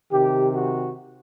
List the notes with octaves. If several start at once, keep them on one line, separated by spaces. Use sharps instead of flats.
C3 D#3 G4
F#4